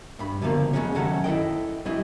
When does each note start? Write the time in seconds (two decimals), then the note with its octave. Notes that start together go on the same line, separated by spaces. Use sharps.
0.19 G2 B5
0.42 C#2 B2 D3 F3 A#3
0.73 F2 C#3 F#3 G#3 C#4
0.95 F#2 D#3 F#3 C#4 A4 F#5
1.24 E4 A4 D#5 G5
1.85 F#2 G3 C4 E4 D#5